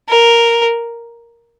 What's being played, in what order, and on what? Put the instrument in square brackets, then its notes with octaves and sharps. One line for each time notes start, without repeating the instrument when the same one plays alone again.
[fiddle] A#4